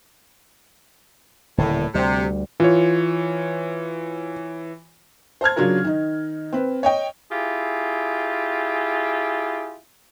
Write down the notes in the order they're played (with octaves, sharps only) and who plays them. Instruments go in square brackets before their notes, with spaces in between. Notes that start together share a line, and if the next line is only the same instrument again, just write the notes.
[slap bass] D#1 D3 D#3 [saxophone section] A2
[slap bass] D2 G3 [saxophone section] C3
[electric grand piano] E3 C#5 [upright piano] F4
[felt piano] C5 A5 F6 G#6
C#3 F#3 D4 F4 F#4 A#4
D#3 D#4
C4 B4
C#5 D#5 G5
[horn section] E4 F4 G4 G#4